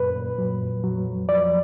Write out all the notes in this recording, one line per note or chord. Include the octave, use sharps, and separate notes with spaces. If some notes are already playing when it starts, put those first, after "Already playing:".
Already playing: F#2 A#2 B4
A#2
F#3
F2
F#3
F2
F3 D5